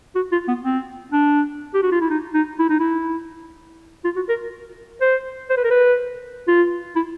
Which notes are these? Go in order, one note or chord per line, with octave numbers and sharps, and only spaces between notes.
F#4
F4
B3
C4
D4
G4
F#4
F4
E4
D#4
D#4
E4
D#4
E4
F4
F#4
A#4
C5
C5
B4
A#4
B4
F4
E4